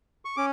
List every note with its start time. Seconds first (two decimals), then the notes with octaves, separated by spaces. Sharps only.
0.25 C#6
0.37 C#4 D6